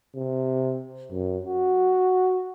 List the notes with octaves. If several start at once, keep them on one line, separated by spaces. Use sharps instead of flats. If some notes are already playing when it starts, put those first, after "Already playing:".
C3
F#2
F#4